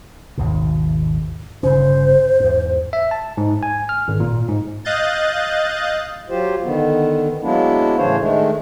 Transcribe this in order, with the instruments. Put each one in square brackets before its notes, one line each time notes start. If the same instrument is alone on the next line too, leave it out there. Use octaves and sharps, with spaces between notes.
[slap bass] G#1 D#2 B2
[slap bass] G1 C#3 C#4 [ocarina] C5
[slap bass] E2 G#2
[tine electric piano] E5
A5
G#2
G#5
F6
G#1
A#2
G#2
[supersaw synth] D#5 F5 F#6 G6 A6
[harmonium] F#3 F4 G4 C5
D3 D#3 B3
F#3 G#3 A#3 B3 D4 E4
A2 C#3 E3 D4 C5 C#5
D#3 G#3 A3 D4